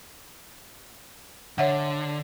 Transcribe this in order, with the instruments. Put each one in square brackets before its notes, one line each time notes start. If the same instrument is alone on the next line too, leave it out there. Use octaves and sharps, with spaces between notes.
[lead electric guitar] D3 [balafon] C#5 E5 F#5